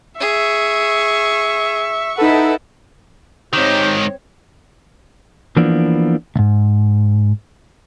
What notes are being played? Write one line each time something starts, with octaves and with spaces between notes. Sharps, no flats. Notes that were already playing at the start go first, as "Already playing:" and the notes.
G#4 E5 C#6
D#4 E4 A4 B4 F#5
G#2 D#3 C4 G4 C#5
E3 F3 A#3 B3 D4
C2 G#2